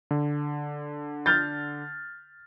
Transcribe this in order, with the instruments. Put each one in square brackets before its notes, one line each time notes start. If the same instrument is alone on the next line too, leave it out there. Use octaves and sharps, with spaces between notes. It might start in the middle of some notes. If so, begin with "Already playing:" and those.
[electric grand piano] D3
[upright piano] F6 G6 A6